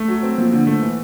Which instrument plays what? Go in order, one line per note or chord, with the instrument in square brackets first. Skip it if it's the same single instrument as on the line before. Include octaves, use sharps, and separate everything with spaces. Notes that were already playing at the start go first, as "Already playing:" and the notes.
Already playing: [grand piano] A3
F#3
C4
[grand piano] F3 [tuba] A#3
[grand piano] D3
A3
E3